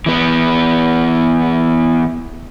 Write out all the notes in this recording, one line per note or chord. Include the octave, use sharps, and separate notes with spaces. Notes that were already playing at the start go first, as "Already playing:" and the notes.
E3 B3